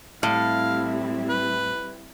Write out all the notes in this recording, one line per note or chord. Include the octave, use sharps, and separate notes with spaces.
A2 G3 C4 E4 F5
B4